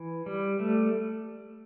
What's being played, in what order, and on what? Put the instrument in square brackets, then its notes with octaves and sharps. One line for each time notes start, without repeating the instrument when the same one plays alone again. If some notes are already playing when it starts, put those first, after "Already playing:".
Already playing: [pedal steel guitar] E3
G3
A3